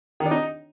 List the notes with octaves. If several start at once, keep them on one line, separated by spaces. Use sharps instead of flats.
D#3
D4
D#4